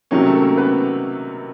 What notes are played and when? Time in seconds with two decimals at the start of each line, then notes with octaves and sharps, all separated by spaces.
0.11 C3 D#3 F#3 A#3 C#4
0.26 A3 A4
0.36 A4
0.42 A#3 A#4
0.58 B3 B4